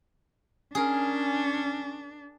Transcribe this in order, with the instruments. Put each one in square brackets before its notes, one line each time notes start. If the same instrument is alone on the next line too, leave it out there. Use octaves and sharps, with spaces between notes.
[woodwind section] C#4 [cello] D4 [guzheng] G#4 A#4